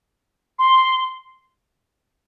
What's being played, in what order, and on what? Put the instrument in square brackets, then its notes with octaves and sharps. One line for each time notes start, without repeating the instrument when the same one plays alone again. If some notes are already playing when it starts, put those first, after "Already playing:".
[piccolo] C6